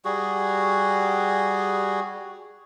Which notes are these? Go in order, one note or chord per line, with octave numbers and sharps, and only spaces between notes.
G3 F#4 G#4